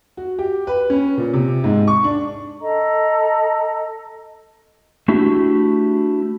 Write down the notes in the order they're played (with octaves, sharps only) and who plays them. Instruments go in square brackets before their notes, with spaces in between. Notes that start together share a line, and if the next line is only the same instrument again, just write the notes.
[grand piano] F#4
G4
B4
C#4
A#2
C3
G#2
C#6
D4
[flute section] A4 D#5 A#5
[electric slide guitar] A3 D4 E4 F#4 G4